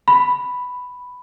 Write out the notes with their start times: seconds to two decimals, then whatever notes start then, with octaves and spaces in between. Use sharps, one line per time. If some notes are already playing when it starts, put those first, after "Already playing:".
0.08 B5